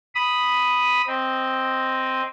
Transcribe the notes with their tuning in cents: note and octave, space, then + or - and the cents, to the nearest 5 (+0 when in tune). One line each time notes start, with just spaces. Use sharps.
B5 +0 D#6 +0
C4 +0 D#5 +0